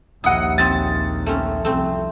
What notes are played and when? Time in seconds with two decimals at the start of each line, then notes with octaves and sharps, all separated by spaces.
0.24 A#1 D#2 E4 D#5 F#5 D#6
0.58 C4 E5 G#5 A6
1.26 A3 C4 C#4
1.65 C2 F2 A3 C4